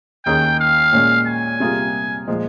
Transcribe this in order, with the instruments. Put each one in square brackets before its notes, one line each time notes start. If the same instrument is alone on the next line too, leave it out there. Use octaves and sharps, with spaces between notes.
[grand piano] D#2 D#3 A#3 C#4 G#4 [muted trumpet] G5
[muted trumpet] F5
[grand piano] A#2 G#3 C#4
[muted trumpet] G#5
[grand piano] C3 G3 A#3 F4 G#4
A#2 F3 G#3